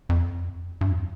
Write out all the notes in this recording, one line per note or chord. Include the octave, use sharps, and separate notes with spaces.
F2
G2
F2